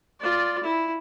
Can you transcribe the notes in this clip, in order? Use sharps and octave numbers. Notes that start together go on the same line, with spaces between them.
F4 D5
E4